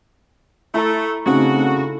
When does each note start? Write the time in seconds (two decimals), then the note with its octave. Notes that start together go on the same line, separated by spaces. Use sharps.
0.74 A3 E4 A4 A#5
1.26 C#3 A3 C4 D#4 F#4